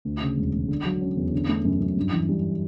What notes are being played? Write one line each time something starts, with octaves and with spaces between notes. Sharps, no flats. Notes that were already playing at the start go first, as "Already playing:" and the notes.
D2
C#3
E1
E1
D3
F#3
C#4
E2
D3
A3
F#2
F#2
G2
E3
G3